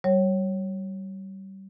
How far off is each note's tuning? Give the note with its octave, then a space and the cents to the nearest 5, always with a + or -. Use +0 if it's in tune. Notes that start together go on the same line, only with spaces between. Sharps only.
G3 -30 C#5 -15